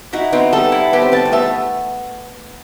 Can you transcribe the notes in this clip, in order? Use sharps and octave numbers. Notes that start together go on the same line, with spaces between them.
D#4 E4 F#4
B3 C4 D#4
G3 B3 A4
E4
B3 G4
C4
G3 B3 A5
A3
G3 B3 E5
A3